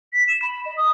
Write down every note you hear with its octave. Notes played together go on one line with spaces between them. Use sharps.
B6
E7
B5
D#5
D#6